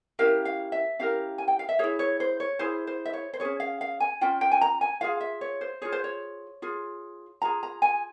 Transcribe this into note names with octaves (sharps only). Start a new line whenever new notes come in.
C#4 E4 G4 A#4 F5
F5
E5
C#4 E4 G4 A#4 F5
G#5
G5
F5
E5
E4 G#4 C#5
C#5
C5
C#5
E4 G#4 C5
C5
E5
C#5
C5
F4 G#4 C#5
C#4
F5
F5
G#5
C#4 F4 G5
G5
G#5
A#5
G#5
F4 G#4 F5
E5
C#5
C5
F4 G#4 C#5
C5
C#5
F4 G#4
F4 G#4 A#5
A#5
G#5